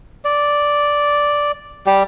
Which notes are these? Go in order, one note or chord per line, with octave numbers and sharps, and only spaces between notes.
D5
G3 G4